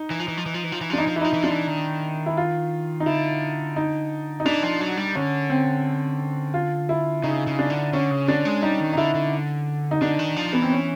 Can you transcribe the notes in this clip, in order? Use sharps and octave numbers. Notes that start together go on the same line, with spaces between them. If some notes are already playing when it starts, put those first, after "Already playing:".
Already playing: D#4
E3
F3
E3
F3
E3
F3
E3
F3
E3
F3 D4
E3 D#4
F3
E3 E4
D#4
F3
E3
F3 D4
E3
D#3
E4
F4
D#4
D3 E4
D#4
D#4
E3 D4
F3
F#3
G3
D3 C#4
C4
F4
E4
C#3 D#4
C#3
D4
D3
D3 C#4
C#3
D3 D4
G#3
G3 D#4
D#3
D#4
D3 E4
D3
D#4
D3 D4
D#3
F3
E3 B3
C4
C#4